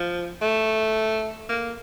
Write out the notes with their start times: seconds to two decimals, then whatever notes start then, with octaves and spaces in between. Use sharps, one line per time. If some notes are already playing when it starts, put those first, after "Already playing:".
Already playing: F3
0.41 A3
1.49 A#3